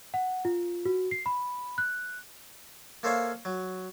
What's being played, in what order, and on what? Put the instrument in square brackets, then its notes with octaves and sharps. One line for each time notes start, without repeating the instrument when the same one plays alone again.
[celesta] F#5
F4
F#4
C7
B5
F#6
[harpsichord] A#3 A4 C5 C#5 E5 F5
F#3